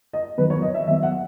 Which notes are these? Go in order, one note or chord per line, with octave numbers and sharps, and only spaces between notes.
D#5
D#3 F#3 B3 B4
C#5
D#5
E5
D#3 F#3 B3 E5
F#5